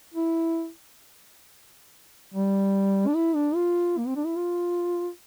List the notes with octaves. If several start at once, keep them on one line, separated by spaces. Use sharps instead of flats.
E4
G3
D4
E4
D4
F4
A#3
C4
D4
E4
F4